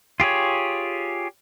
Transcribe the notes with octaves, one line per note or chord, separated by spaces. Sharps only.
F4 G4 G#4 C#5